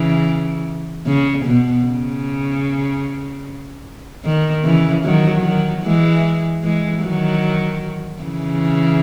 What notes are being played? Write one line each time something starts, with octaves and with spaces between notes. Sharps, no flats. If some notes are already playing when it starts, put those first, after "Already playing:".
Already playing: C#3 E3
C#3
B2
C#3
D#3
C#3 E3
D#3 F#3
D#3 F#3
E3 G#3
E3 G#3
D#3 F#3
C#3 E3